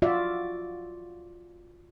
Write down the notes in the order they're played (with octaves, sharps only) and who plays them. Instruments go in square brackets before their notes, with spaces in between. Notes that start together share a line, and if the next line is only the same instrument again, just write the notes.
[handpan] F4 F#4 D5 E5